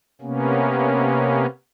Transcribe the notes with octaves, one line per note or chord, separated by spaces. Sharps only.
C3 A#3 B3 C#4